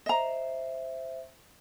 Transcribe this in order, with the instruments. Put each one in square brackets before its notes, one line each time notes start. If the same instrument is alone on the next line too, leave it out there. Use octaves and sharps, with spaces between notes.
[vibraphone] C5 E5 [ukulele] D#5 A#5